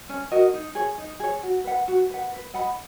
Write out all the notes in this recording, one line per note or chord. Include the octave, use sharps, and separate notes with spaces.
C#4
F#4 A#4 D#5
D#4
G#4 C#5
D#4
G#4 C#5
F#4
B4 F#5
F#4
B4 F#5
B4
D#5 F#5 B5